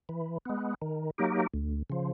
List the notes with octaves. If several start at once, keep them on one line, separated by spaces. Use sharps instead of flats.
E3
G#3 B3
D#3
F#3 A#3 D#4 G4
D2
C#3 F3